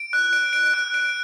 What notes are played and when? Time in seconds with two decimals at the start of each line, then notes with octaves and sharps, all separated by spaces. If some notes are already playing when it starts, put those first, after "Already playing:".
Already playing: D7
0.13 F#6
0.33 D7
0.53 D7
0.74 F#6
0.94 D7